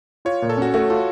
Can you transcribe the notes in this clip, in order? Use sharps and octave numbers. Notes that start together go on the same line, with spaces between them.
F4 C#5
A#2
A4
C#4 F#4
A3 F#4
F4 A4